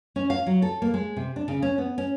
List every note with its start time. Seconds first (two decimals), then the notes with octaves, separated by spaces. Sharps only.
0.16 C#4
0.30 F5
0.46 F#3
0.62 A4
0.82 A#3
0.94 G#3
1.16 C3
1.36 D4
1.48 C#3
1.62 C#4
1.78 B3
1.98 C#4